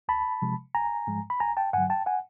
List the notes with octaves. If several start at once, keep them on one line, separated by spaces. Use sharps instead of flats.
D2 A5 B5
C3 F3 G#3
A1 G#5 A#5
G#2 F3 G#3
B5
A1 G#5 A#5
G5 A5
G2 D3 F#3 F#5 G#5
G5 A5
F#5 G#5